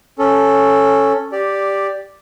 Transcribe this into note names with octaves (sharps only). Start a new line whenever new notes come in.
C#4 A4
G4 D5